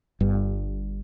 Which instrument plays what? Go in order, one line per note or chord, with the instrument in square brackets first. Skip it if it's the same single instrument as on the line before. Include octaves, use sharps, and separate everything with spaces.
[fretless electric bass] G1 G2